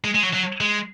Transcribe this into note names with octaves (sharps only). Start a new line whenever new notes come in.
G#3
G#3
F#3
F#3
G#3